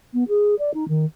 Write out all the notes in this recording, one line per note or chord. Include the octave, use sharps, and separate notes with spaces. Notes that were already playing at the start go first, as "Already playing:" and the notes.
B3
G#4
D5
D#4
D#3